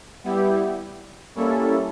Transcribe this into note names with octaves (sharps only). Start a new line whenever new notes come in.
G3 B3 E4 G4
G3 A#3 C#4 E4 A4